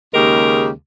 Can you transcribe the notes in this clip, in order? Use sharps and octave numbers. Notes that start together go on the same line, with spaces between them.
D#2 C#3 G#3 G4 A#4